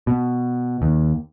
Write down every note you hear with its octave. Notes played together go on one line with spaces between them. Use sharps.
B2
D#2